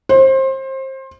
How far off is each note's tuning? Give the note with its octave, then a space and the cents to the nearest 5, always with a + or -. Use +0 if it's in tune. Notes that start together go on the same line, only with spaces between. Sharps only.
C5 +25